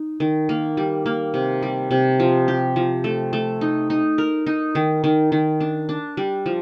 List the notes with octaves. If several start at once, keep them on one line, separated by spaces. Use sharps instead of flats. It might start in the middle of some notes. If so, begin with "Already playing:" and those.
Already playing: D#4
D#3
A#3
G3
A#3
C3
G3
C3
F3
G4
F3
A3
A3
D#4
D#4
A#4
D#4
D#3
D#3
D#3
D4
D4
G3
F3